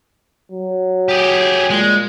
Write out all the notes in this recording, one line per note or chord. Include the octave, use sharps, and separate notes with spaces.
F#3
G4 G#4
A#2 G#3